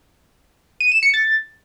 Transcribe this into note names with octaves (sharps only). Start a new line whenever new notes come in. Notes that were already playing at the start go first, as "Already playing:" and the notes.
D#7
E7
C#7
A6